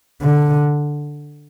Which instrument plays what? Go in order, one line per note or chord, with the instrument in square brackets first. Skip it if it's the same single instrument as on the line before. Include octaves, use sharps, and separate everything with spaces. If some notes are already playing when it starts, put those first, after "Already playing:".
[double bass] D3